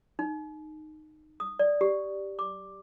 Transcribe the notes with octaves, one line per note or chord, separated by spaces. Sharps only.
D#4
D#6
D5
G4
D6